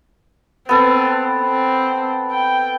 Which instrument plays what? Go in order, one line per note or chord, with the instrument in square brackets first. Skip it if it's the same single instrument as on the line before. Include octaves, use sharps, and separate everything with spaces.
[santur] B3 A4 [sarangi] C4
[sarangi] C4
G5